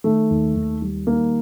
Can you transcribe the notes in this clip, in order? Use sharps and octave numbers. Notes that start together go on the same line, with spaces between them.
D#3 A3
D#2
D#2
G3
D#3 A#3